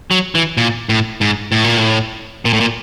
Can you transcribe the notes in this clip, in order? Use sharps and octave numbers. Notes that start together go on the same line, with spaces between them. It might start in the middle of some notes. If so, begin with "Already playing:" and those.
F#3
E3
A#2
A2
G#2
A2
A#2
A2
A#2
A2
A#2